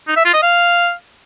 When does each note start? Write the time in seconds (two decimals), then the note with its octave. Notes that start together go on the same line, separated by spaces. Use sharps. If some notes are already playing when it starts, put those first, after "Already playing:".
0.08 D#4
0.16 E5
0.25 F4
0.34 D#5
0.42 F5